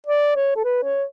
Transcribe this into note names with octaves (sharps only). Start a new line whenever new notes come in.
D5
C#5
A4
B4
C#5